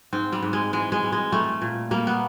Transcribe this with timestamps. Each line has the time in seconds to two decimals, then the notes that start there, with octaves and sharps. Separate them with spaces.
0.13 G#2 C4
0.32 G3
0.43 G#2
0.53 G#3
0.73 E3 G#3
0.92 G#3
1.03 G3
1.12 G#3
1.32 G3 A3
1.62 A#2
1.91 G3 A#3
2.07 B3